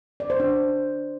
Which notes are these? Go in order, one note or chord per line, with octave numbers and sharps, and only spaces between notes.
D5
C5
D4